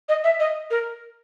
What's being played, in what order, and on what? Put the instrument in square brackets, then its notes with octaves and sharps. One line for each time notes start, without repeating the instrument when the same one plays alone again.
[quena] D#5
E5
D#5
A#4